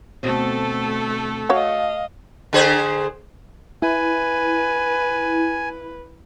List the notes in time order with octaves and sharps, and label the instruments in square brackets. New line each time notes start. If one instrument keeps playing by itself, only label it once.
[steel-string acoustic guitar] D2 B2 C4 [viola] A3 A4
[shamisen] F#4 C#5 F#5 [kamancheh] D#5 F5
[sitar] D3 G#4 C5
[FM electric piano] E4 [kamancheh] B4 [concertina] G#5